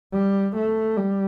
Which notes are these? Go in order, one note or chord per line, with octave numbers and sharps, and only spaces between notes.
G3
A3
G3